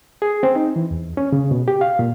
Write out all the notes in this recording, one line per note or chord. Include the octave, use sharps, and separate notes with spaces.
G#4
C4
D#4
E3
E2
C#4
C#3
B2
G4
F5
A#2